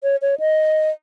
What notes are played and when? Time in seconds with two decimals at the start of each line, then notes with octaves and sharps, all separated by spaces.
0.03 C#5
0.22 C#5
0.40 D#5